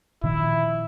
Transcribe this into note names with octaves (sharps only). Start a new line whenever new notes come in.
A#2 D#3 F3 E4